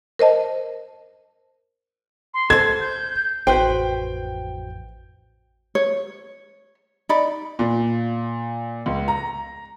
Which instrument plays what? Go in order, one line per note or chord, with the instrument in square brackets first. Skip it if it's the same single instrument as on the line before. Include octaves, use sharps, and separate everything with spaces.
[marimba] A#4 C5 D#5 A5
[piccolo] C6
[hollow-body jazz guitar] A4 C5 [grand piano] G#6
[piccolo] G6
[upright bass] A1 F2 [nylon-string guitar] F#4 B4 C5 [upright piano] G5
[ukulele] C#5
D#4 D5 B5
[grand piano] A#2
C#2
A#5